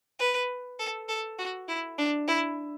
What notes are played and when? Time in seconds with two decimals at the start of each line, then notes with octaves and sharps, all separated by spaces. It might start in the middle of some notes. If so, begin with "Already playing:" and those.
0.19 B4
0.79 A4
1.08 A4
1.38 F#4
1.68 E4
1.98 D4
2.28 E4